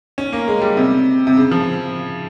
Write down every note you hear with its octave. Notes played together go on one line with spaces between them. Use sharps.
C#4
A#3
G#3
G3
C3
C3
C#3
F3